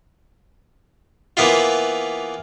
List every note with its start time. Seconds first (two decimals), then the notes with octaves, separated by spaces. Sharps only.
1.37 E3 A#3 B3 E4 F4